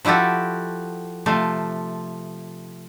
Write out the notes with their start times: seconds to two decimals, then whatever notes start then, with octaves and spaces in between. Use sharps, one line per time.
0.05 F3 E4 F#4 G4 A4
1.26 C3 F3 A3